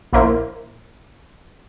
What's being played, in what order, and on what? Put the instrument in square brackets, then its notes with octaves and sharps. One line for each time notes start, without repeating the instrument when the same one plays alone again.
[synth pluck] A#1 A#3 E4 A#4 C5